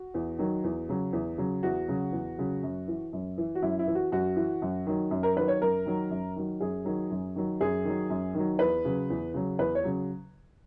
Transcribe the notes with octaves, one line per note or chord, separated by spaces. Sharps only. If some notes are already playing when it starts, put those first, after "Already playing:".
Already playing: F#4
E2
D#3 F#3
E2
C#3 F#3
E2
C#3 F#3
E2 F#4
C#3 F#3
E2
C#3 F#3
F#2
E3
F#2
E3
F#4
F#2 E4
E4
E3
F#4
F#2 F#4
E3
F#2
D#3 F#3
F#2
A#4
D#3 F#3 B4
C#5
F#2 A#4
D#3 F#3
F#2
D#3 F#3
F#2 G#4
D#3 F#3
F#2
D#3 F#3
F#2 G#4
D#3 F#3
F#2
D#3 F#3
E2 B4
C#3 F#3
E2
C#3 F#3
E2 B4
C#5
C#3 F#3